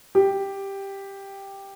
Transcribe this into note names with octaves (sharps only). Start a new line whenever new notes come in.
G4